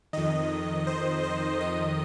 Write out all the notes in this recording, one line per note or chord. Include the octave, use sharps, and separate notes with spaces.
F2 D#3 D#5
C5
C5
F2 D#3 D#5